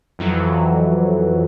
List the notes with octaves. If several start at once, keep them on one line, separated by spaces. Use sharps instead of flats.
F2 E3 F#3